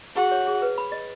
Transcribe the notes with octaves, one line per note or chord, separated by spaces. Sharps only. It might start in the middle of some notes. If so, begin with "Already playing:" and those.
F#4 G#4
C#5
G#4
B4
B5
D#5